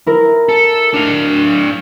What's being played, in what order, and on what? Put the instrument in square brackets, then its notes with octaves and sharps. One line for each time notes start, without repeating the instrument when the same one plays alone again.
[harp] E4 A#4
[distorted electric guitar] A4
D4 F5